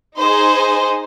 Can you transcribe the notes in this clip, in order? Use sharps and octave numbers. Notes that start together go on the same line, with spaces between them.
D#4 G#4 C5 D#5